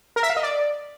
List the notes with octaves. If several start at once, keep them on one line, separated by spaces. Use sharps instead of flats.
A#4
E5
F5
D#5
D5